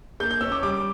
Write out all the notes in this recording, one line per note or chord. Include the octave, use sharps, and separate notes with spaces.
A#3 G6
G6
C#4 E6
D6
G3 D6